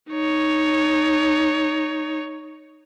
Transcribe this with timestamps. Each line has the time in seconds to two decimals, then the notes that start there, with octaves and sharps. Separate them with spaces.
0.11 D#4 C#5